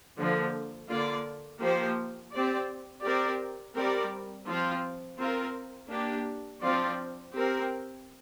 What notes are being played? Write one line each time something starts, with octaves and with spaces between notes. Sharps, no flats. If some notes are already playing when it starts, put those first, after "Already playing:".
D3 F3 A#3
D3 A#3 F4 D5
F3 A#3 G4 C5
C4 G4 D5
C4 G4 A#4 D5
G3 C4 G4 A#4 D5
F3 C4 F4
C4 F4 A#4
A#3 D4 G4
F3 C4 F4 D5
C4 G4 A#4